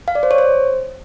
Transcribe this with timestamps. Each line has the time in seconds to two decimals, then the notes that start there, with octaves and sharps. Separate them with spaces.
0.08 F5
0.15 D5
0.23 C5
0.31 C#5
0.38 C5